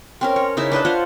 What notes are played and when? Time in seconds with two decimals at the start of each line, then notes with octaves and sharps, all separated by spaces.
0.21 C4 C#4 A#4
0.36 C#5
0.57 C#3 D#4 E4 E5
0.72 D4 B4 D#5 A5
0.85 F4 C5 C#5 F#5